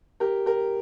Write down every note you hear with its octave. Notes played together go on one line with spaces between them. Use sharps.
G4 A#4
G4 A#4